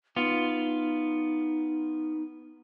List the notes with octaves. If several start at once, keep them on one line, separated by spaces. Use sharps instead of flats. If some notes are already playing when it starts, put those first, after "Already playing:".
B3 D#4 F4